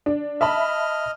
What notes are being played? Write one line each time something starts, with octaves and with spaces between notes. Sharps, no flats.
D4
D#5 E5 A5 B5 F6